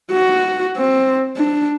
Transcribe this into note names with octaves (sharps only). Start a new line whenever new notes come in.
F#4
C4
D4